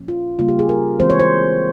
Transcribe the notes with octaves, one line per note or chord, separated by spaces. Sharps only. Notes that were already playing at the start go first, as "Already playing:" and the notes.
Already playing: A#2 F3 A#3 C#4
F4
C#3 G3 A#3 F4
G4
G#4
A#4
E3 G#3 C4 C5
C#5
C5